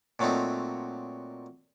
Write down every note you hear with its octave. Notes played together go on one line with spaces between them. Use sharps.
A#2 F#3 A3 C4 D#4